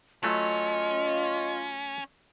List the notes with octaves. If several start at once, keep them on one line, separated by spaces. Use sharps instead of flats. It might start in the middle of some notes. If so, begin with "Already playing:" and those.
F#3 A3 C#4 F4 D#5